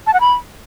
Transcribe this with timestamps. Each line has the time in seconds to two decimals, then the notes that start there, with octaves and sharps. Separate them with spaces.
0.07 A5
0.14 F#5
0.20 B5